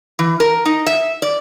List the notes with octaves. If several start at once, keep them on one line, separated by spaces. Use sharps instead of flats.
E3
A#4
D#4
E5
D5